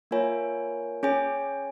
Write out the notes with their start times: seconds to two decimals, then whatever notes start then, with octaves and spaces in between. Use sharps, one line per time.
0.11 A#3 F4 A#4 C#5 G#5
1.03 C#4 G#4 C#5 G#5